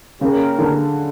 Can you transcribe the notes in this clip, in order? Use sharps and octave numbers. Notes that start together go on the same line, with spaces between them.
C#3 A#3 C#4 G4 A#4
D3